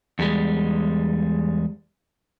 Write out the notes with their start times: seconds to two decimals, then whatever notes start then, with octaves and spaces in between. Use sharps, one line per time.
0.19 E2 G3 G#3